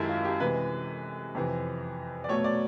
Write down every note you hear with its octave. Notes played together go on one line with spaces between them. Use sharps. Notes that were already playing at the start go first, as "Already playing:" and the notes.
Already playing: F#2 D#3 G#3 E4 G4 A4 A#4
F4
G4
C3 E3 G#3 B4
F2 C3 E3
D5
B2 F#3 A3 C#5
D5